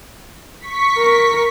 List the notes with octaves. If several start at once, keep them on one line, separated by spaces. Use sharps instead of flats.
C#6 B6
A#4